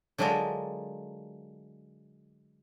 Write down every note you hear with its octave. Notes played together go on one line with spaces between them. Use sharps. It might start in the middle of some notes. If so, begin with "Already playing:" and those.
D3 F#3 G#3 D4 F4 A#4